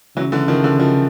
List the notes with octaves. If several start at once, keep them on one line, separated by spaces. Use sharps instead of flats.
C#3 E3 F#3
D3 E3
D#3 F3
D3 E3
D#3 F3